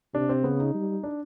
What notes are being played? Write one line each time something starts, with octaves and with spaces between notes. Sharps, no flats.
C3 D4
C4
C#3 B3
D#4
G3
D4